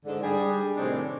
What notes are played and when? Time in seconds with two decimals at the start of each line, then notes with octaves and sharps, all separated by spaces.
0.05 G#2 D3
0.22 G3 D4 G#4
0.76 A2 C3 D#3 C4 D4 D#4